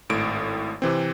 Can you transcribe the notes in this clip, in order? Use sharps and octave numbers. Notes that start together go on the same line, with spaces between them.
G#1 A2 D7
C3 E3 C4